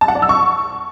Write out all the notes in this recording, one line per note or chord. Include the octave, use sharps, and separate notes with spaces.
A5
F#5
D5
E6
C#6